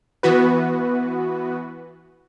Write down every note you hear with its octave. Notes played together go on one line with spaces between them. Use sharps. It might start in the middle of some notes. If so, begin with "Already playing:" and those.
E3 B3 F#4 B4